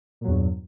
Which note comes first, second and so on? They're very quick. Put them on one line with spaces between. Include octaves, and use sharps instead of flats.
A#2 F#3 E2 G2